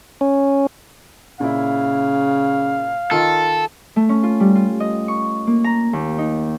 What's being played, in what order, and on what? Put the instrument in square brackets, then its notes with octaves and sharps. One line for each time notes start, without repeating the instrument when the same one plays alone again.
[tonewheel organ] C#4
[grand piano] A#2 E4 [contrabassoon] C#3 [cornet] F5
[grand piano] D#3 F4 [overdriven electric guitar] A4
[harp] A3
C#4
F4
G3
F4
D#5
C#6
A#3
A#5
D#2
D#4